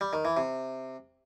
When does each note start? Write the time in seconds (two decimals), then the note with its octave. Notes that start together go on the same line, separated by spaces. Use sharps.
0.01 G3
0.13 D#3
0.25 E3
0.37 C3